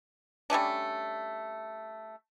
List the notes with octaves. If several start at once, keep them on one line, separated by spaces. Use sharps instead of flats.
G3 A3 C#4 D4